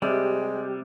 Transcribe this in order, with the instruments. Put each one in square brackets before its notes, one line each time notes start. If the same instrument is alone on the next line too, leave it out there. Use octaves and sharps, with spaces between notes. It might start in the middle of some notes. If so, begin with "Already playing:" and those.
[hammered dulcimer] C3 [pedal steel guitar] G3 [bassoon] G#3 [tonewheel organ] G4